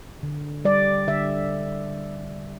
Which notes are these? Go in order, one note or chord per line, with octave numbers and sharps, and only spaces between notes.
D3
G3 D5
D3 E5